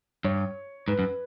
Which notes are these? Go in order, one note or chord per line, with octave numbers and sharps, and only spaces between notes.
G2 C#5
G#2 B4
F#2